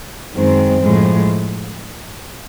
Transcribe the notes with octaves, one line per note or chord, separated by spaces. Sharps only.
F#2 D#3 G#3 C4
A2 F3 G#3